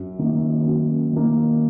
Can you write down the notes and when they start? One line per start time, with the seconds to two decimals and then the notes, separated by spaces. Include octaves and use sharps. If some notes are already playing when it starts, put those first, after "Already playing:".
Already playing: F#2
0.19 D#3 A#3
0.66 F#2
1.13 D#3 A#3